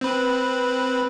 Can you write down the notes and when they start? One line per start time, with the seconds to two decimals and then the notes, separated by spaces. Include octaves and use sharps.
0.01 C4 B4